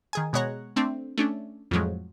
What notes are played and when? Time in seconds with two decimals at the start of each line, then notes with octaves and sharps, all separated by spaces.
0.13 D#3 G#4 G#5
0.33 B2 G#3 B3 C#5 F#5 A#5
0.76 A3 C4 D4
1.18 A3 C#4 D4
1.71 F2 A2 F3 F#3 G#3